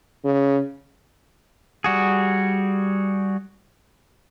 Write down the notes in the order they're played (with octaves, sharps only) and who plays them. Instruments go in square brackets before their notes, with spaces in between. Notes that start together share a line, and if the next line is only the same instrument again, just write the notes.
[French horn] C#3
[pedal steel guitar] G3 F#4 G#4